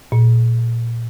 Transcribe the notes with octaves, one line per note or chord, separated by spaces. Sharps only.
A#2